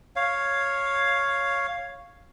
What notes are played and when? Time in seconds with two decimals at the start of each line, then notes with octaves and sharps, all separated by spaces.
0.16 C#5 F5